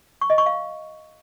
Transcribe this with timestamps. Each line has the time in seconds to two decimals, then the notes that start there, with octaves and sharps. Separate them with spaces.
0.21 C#6
0.30 D#5
0.38 C#6
0.46 F5